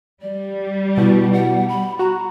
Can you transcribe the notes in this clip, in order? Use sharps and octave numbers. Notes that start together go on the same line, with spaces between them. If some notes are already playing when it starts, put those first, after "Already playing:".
G3 D5
B2 E4
F#5
B5
F#4 A#5